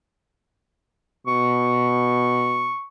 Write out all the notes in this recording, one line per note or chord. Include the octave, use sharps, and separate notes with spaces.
B2 C#6